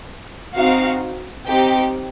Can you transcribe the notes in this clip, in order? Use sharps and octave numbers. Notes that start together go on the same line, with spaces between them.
C4 D#4 F#4 F5
C4 D#4 G4 G5